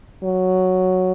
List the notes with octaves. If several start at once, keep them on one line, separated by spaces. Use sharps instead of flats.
F#3